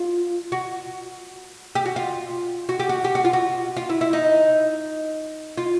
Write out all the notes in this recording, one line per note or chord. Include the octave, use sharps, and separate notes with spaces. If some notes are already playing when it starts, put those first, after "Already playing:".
Already playing: F4
F#4
G4
F#4
F4
F#4
G4
F#4
G4
F#4
F4
F#4
F4
E4
E4
D#4
F4